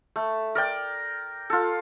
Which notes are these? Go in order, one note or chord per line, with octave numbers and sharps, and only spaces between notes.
A3
A#4 D5 G5
F4 A4